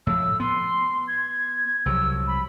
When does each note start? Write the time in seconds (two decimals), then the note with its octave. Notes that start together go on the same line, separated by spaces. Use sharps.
0.07 A2 F3 E6
0.40 B3 C6
1.08 G#6
1.86 C2 F3 F#3 E6
2.27 B5